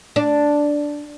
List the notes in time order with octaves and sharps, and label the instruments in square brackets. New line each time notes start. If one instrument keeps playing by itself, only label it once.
[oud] D4